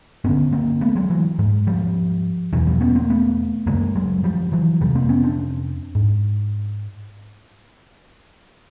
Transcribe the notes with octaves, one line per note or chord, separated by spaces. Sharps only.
G2 D3 B3 C#4
A#3 C4
A3 B3
F#3 G#3
E3 F#3
G#2
F3 G3
E2 B2 E3 F#3
F3 G3
B3 C#4
A#3 C4
A3 B3
F#2 C#3 G#3 A#3
F#3 G#3
F3 G3
E3 F#3
F2 C3 F3 G3
A#3 C4
B3 C#4
C4 D4
G#2